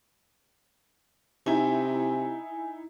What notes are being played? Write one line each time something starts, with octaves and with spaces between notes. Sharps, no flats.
C3 D#4 E4 G#5